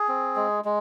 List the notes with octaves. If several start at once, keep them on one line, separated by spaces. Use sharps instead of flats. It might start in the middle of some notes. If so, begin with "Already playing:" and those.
Already playing: G#4
C4
G#3
G#3